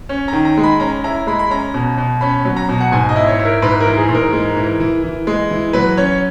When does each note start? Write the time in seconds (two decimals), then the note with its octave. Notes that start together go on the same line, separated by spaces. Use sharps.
0.09 C#4
0.28 D#3 A#5
0.45 A#5
0.57 G#3
0.63 B5
0.80 C#4 A#5
1.04 E4 A#5
1.27 G#3 B5
1.39 B5
1.50 C#4 A#5
1.74 B2
1.98 B2
2.21 C#4 B5
2.45 F#3
2.57 A#5
2.69 B2
2.80 F#5
2.92 G#2 G#5
3.09 D#5
3.16 E4
3.27 C#5
3.39 E4
3.45 A#4
3.62 G#2 B4
3.80 A#4
3.86 E3
3.97 G#4
4.09 G#2
4.15 A#4
4.33 G#3
4.57 E3
4.80 E3
5.04 E3
5.27 G#3
5.51 E3
5.73 F#3 B4
5.97 C#4 C#5